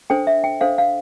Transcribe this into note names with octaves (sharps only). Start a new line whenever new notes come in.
D4 A4 C5 G5
E5
G5
D4 A4 C5 F5
F5